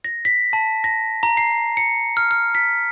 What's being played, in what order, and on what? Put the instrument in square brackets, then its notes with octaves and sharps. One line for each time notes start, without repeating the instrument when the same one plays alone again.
[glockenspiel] A#6
B6
A5
A#6
A#5
C7
C#7
F6
F6
B6